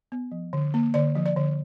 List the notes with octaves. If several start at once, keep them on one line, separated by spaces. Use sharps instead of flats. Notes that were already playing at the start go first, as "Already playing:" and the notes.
B3
F3
D3
A#3
D3 D5
F3
D5
D3